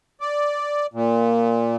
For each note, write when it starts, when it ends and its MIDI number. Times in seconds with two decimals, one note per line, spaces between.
0.21 0.86 74
0.94 1.76 46